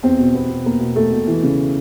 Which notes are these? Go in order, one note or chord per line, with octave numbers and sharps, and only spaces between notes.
E2 C4
B2
E2 B3
B2
E2 A#3
B2
E2 A3
B2
E3
C#3